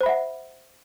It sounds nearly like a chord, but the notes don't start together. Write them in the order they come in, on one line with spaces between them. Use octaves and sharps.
C5 B5 E5 F#5